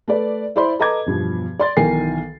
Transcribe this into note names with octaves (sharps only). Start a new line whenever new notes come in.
A3 B4 D5
E4 C5 D5 B5 C6
A4 B4 D#5 A#5 D6 G#6
E2 G2 B2 F3
D5 C6 A6
B1 D#3 E3 A#4 G#5 C7